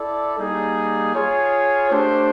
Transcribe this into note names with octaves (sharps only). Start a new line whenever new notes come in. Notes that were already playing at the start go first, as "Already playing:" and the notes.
Already playing: E4 A4 D5
G3 A#3 D#4 G#4
F4 G#4 C#5
A3 D4 G4 C5